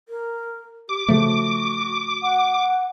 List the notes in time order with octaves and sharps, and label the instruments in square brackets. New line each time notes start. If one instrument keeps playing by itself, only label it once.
[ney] A#4
[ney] G4 [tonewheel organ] D6
[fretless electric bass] C#3 F3 A3 [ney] F#4
[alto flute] F#5